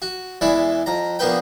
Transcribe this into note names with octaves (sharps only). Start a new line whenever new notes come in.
F#4
E2 E3 G#3 E4 D5
F2 A#5
A#1 A#3 B3 B4 G5